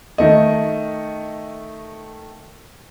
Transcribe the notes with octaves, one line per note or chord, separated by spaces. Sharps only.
D#3 A3 D#5